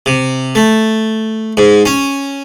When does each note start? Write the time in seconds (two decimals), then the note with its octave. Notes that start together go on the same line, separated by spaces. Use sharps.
0.06 C3
0.55 A3
1.57 G#2
1.86 C#4